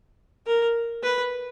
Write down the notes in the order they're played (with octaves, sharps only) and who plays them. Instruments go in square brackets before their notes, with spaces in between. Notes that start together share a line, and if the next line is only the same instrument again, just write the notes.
[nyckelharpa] A#4
B4